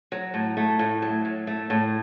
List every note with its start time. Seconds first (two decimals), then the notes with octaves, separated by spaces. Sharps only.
0.12 F#3
0.34 A2
0.57 A3
0.79 A2
1.02 F#3
1.25 A2
1.47 A3
1.70 A2